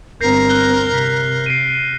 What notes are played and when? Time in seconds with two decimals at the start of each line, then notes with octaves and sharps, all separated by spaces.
0.21 G1 C4 A#4 G6 A#6 C7
0.49 F6 F#6 G7
0.94 C3 B6
1.46 C7 D7 D#7